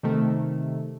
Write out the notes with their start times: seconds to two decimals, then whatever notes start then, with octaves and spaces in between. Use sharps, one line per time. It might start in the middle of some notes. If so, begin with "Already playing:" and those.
0.03 C3 D#3 A3